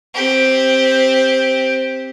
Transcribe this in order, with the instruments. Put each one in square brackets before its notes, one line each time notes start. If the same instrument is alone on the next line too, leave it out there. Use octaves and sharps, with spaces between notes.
[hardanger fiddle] C4 G4